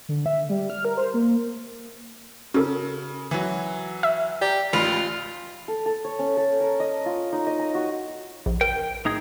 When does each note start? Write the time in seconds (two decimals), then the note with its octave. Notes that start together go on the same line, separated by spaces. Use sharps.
0.09 D3
0.26 E5
0.49 G3
0.70 F6
0.85 A#4
0.97 C5
1.14 A#3
2.54 C#3 F#4 A4 A#4
3.31 E3 F#3
4.03 E5
4.42 G4 D5 A#5
4.73 A1 F4 B5
5.68 A4
5.86 A4
6.04 C#5
6.19 C#4
6.37 A4
6.60 A#4
6.80 D#5
7.06 F4
7.32 D#4
7.47 D#5
7.59 A#5
7.75 F#4
8.46 A#1
8.61 A#4 G5
9.05 A2 D#4 G#4